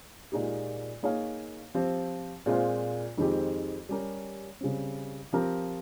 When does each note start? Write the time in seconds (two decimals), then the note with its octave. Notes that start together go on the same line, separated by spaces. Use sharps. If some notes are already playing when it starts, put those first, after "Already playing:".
0.32 A#2 G#3 D#4 G4
1.03 A#3 D#4 G#4 C#5 F5
1.75 F3 C4 G4 C5
2.46 A#2 G#3 C4 F4 C5
3.17 F2 D#3 G#3 C4 G4
3.89 G3 C#4 G4 A#4
4.61 C#3 G3 C4
5.33 F3 C4 G4 A#4